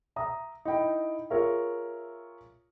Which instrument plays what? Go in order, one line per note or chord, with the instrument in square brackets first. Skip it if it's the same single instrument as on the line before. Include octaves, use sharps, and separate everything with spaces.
[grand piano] E5 A#5 D#6
D#4 E4 G5 B5
F4 G#4 A#4 C#5 E5